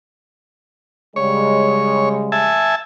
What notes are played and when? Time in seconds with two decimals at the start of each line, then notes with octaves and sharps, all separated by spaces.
1.16 C#3 G3 G#3 C#5
2.32 E5 G#5 A5